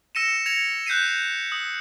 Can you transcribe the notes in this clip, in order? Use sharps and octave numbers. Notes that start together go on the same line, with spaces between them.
E6 A#6 C#7 D#7 E7
G#6 A#6 C#7 F7
F#6 G6 B6 C7 D#7
D#6